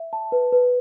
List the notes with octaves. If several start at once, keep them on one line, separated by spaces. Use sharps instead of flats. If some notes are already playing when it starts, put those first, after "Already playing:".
Already playing: E5
A5
B4
B4